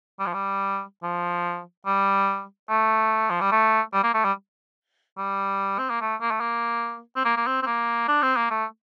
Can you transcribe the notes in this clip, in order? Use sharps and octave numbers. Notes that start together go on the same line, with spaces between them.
G3
F3
G3
F3
G3
A3
F3
G3
A3
G3
A#3
A3
G3
G3
C4
A#3
A3
A#3
A3
A#3
C4
A#3
A#3
C4
C4
A#3
D4
C4
A#3
A3